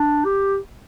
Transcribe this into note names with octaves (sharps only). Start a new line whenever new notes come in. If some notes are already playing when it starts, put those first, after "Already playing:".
Already playing: D4
G4